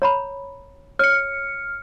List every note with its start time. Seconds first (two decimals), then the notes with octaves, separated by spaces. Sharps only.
0.02 C#5 A#5 B5
0.99 C#5 F6 C#7